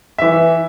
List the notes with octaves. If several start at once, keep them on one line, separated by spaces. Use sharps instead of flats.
E3 E5